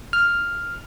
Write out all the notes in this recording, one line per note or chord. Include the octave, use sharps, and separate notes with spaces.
F6